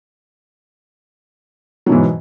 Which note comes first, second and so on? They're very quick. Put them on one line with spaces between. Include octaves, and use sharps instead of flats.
F#3 B2 E3 G#2